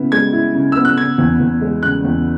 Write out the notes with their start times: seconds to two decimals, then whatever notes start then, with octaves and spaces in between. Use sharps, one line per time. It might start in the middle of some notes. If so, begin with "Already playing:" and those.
Already playing: C#3 B3 E4
0.12 G#3 G#6
0.33 E4
0.55 C#3
0.72 B3 E6
0.85 F#6
0.97 C#3 G#6
1.18 E2
1.40 E2
1.61 G#3
1.83 C#3 F#6
2.05 E2